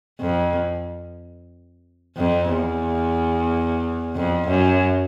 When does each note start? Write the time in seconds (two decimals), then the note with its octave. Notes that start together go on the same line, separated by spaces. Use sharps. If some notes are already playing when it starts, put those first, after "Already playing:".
0.20 F2
2.17 F2
2.51 E2
4.15 F2
4.48 F#2